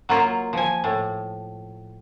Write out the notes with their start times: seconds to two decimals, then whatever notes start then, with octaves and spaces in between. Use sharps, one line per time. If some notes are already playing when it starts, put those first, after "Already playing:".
0.09 F#3 A#3 F4
0.53 F3 G#5
0.84 A2